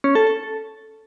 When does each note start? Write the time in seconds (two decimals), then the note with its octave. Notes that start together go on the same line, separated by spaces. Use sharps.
0.04 C#4
0.15 A4
0.27 A4